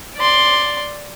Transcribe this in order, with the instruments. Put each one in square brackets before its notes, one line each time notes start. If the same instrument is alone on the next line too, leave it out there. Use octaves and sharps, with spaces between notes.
[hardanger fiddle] D5 C6